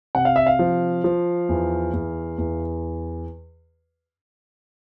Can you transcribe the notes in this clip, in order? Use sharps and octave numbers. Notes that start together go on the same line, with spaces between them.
C3 F#5
F5
E5
F5
F3
F3
E2
E2
E2